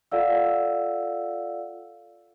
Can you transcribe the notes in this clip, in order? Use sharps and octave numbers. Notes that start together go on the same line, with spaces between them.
F4 A4 D5 F5 F#5 E6